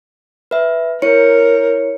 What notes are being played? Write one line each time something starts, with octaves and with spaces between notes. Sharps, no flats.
B4 E5
E4 A#4 C#5 C#7